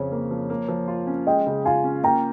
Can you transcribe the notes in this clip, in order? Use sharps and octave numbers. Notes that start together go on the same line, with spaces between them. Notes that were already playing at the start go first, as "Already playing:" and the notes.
Already playing: F2 C#3 C#5
A#3
F3
A#3
F3
F4
C#4
G#3 D#5 G5
C#3
F4 F5 G#5
C#4
A#3 G5 A#5